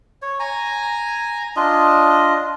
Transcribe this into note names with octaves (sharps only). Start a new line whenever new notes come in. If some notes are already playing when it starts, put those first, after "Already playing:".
C#5
G#5 A#5
D4 F4 D#5